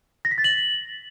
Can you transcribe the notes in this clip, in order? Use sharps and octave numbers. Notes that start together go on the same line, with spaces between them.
A#6
B6
A6
F#7